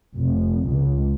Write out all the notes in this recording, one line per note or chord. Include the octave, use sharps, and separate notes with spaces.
F1
C#2